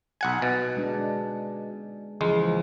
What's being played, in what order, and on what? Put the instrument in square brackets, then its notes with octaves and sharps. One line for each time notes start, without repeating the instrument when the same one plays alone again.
[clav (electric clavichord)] B1 F#5 G#5
B2
[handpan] G#3 D4
[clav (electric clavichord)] C#2 G#3 [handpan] E3 F3